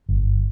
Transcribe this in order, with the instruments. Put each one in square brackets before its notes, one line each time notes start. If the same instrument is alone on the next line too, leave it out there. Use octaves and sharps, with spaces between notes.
[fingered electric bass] G1